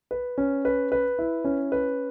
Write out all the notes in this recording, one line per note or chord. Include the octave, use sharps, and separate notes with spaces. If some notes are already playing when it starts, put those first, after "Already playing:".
B4
C#4
B4
B4
E4
C#4
B4